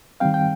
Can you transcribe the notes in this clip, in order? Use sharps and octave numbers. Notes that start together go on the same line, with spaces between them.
D#3 G3 C4 F5 G5
G5